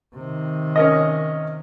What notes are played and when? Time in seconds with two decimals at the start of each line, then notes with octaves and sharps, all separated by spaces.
0.15 C3 D#3
0.76 C#4 A#4 D#5